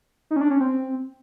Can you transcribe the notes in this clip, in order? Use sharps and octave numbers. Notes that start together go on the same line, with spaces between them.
D#4
C#4
D4
C#4
C4